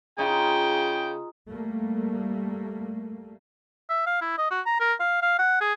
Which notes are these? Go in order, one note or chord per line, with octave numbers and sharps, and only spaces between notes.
C#3 D#4 F4 G#4 G5
G3 A3 A#3
E5
F5
E4
D#5
F#4
A#5
A#4
F5
F5
F#5
G#4